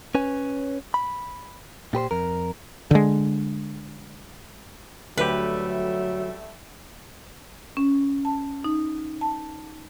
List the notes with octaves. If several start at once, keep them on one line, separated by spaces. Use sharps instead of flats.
C#4 B4 C#5 G#5
B5
A#2 G4 B4 C5
F2 A#4
D3 G#3
D2 F#3 G3 A3 G4 B4 E5
C#4
A5
D#4
A5